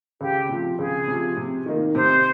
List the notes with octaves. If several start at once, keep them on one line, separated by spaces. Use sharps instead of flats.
C#2 G4
C3 F3
C#2 G#4
C3 F3
C3
D#3 A#3 D#4
C3 C5